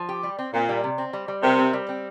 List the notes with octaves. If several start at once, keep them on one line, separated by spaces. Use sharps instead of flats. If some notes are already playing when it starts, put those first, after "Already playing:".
Already playing: F3
G4
G3
C4
A#2 C4
G3
C3
C4
G3
G3
C3 A#4
C4
G3
C4